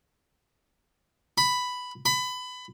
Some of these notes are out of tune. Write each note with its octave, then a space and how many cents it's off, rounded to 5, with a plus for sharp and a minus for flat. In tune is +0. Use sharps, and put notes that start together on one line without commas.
B5 +5
B5 +20